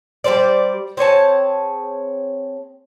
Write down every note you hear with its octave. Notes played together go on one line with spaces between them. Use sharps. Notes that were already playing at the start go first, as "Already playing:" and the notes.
G3 A#3 C5 D5
C4 G#4 C#5 A5